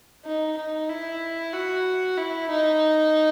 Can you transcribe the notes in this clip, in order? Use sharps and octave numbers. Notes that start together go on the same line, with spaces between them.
D#4
D#4
E4
F#4
E4
D#4